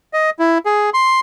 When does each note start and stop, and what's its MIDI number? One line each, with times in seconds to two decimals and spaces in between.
0.13 0.30 75
0.39 0.58 64
0.65 0.90 68
0.94 1.20 84